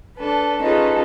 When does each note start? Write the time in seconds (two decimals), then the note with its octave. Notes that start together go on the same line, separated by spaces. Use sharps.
0.18 D4 A4 B4
0.62 C#4 D#4 F4 G#4 A4 B4